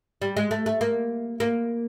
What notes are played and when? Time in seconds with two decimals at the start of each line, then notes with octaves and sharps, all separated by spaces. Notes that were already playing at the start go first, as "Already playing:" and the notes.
0.22 G3
0.37 G#3
0.51 A3
0.66 A3
0.81 A#3
1.40 A#3